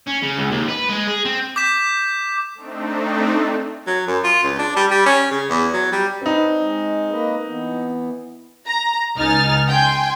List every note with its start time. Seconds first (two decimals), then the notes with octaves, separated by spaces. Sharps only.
0.07 C#4
0.23 C#3
0.37 C#2
0.51 D#2
0.68 B4
0.89 G#3
1.07 G#4
1.25 C4
1.56 D6 G6 B6 E7
2.55 A3 C4 D4 D#4
3.87 F#3
4.08 F#2
4.24 F4
4.43 C#2
4.59 D4
4.76 G3
4.91 G3
5.06 C#4
5.31 C#3
5.49 E2
5.73 F#3
5.92 G3
6.21 C4 D4 D#4 B4
6.59 G#3
7.11 A#3 B4 D#5
7.47 E3 B3
8.67 A#5
9.16 C#2 D#4 G#5 F6 A6
9.69 G5 G#5 C6